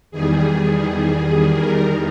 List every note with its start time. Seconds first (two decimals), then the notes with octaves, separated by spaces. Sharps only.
0.11 E2 D#3 G3 G#4
1.53 A#4